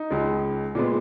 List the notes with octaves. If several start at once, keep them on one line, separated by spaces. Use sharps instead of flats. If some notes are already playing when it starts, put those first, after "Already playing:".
Already playing: D#4
C#2 C#3 G#3
A#2 G#3 B3